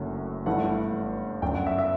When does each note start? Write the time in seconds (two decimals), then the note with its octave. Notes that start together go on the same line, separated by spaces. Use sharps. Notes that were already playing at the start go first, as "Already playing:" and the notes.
Already playing: F#1 F#2 D3 F#3 A3
0.46 G1 G2 E3 A3 F#5
1.42 G1 F#2 D3 G5
1.54 F#5
1.67 E5
1.78 E5